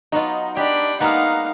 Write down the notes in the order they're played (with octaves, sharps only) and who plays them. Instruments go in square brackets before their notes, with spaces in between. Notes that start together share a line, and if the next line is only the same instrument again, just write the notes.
[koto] F#3 B3 F4 [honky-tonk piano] D#4
[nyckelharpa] D4 B5 [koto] G4 B4
[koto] G#3 A#3 B3 [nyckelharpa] D#4 F5 [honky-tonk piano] F#5 A#5